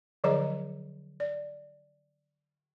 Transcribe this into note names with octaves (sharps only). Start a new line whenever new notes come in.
D3 F3 F#3 G#4 D#5 A#5
D5